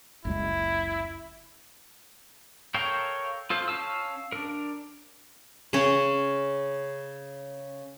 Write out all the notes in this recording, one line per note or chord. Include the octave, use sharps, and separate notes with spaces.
F#1 C#2 G#3 E4
A4 A#4 C#5 F5 G5
F4 A4 C5
C#4 F5 A5 E6
D4 A#4
C#3 C#4